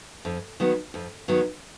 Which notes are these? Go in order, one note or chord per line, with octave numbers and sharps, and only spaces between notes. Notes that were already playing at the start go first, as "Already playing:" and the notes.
F2
D#3 F#3 B3
F2
D#3 F#3 B3